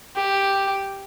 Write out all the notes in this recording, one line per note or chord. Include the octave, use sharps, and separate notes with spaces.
G4